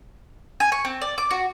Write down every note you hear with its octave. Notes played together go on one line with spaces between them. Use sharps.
G#5
C#6
C4
D5
D6
F#4